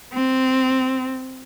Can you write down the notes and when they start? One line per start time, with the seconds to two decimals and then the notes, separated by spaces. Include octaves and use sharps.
0.13 C4